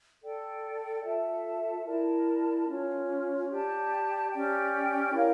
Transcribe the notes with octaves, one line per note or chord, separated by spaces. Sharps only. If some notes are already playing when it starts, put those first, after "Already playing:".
A4 D5 G5
F4 A4 E5 A5
E4 A#4 D5 A5
C#4 F4 C#5
G4 D5 A5
C#4 G4 D5 G5
E4 A#4 C#5 F5